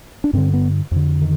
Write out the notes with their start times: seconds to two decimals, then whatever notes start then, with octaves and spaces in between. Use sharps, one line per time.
0.24 D4
0.33 G2 D3 C4
0.53 B3
0.91 F2 D3
1.21 D#3